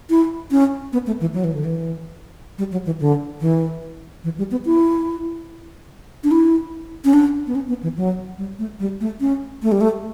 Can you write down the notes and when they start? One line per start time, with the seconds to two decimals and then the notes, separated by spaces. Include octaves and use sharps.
0.10 E4
0.51 C#4
0.93 B3
1.07 A3
1.21 E3
1.34 F#3
1.44 E3
1.54 D3
1.64 E3
2.58 G3
2.72 F#3
2.86 E3
3.00 D3
3.41 E3
4.24 E3
4.38 G3
4.51 B3
4.65 E4
6.24 D4
6.31 E4
7.05 C#4
7.13 D4
7.47 B3
7.55 C#4
7.69 B3
7.83 E3
7.97 F#3
8.38 G3
8.59 A3
8.80 G3
9.01 A3
9.20 C#4
9.63 A3
9.72 G3
9.81 A3